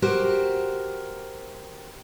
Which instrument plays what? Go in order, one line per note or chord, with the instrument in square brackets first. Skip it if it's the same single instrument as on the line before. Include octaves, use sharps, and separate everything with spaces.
[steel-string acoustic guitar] F#4 G4 A#4 C5